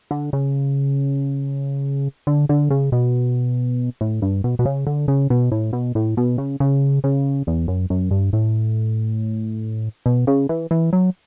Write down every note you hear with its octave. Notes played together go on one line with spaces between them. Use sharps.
D3
C#3
D3
D3
C#3
B2
A2
G2
B2
B2
C#3
D3
C#3
B2
A2
B2
A2
B2
C#3
C#3
C#3
E2
F#2
F#2
G2
A2
B2
C#3
E3
E3
F#3